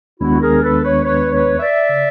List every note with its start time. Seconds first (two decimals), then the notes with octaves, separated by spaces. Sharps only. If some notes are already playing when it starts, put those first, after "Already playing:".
0.20 D#2 D#3 G#3 B3 D4 E4 F#4
0.41 G#4 A#4
0.62 A4 B4
0.83 B4 C#5
1.04 B4 C#5
1.32 B4 C#5
1.60 D5 E5
1.89 C#3